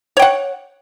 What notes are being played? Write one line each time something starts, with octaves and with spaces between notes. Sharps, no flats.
C#5 F#5 G5